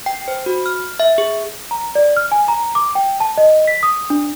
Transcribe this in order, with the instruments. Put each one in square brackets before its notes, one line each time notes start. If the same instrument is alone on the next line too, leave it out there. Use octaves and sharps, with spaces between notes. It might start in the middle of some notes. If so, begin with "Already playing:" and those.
[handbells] G5
C5
F#4
F6
E5
G#4
[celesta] A#5
D5
F6
G#5
A#5
D6
G5
A5
D#5
B6
D#6
D4